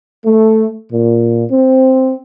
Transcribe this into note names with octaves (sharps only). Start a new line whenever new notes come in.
A3
A#2
C4